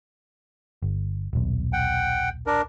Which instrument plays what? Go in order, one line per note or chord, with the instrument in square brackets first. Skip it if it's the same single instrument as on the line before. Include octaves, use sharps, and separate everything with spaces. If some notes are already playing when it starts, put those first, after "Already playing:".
[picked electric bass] G1
D#1 B1
[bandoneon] F#5 G5
D4 A#4